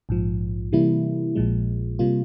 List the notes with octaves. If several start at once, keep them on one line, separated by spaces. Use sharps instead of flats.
A#1 G#2 F3
C3 E3 G3 A#3 E4
A#1 A#2 F3 G#3
C3 G3 A#3 F4